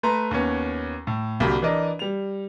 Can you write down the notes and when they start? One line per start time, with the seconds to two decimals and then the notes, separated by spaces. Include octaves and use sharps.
0.03 A3 B4 A#5 C6
0.31 D#2 B3 C#4
1.07 A2
1.40 C2 D3 F#3 A#3 G4 B5
1.62 E3 D4 A#4 D5 D#5
1.99 G3 F7